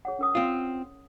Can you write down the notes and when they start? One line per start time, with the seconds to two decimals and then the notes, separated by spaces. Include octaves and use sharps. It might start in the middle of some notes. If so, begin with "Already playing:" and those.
0.05 G#4 C#5 F#5
0.19 C#4 A#4 D#6
0.35 C4 F4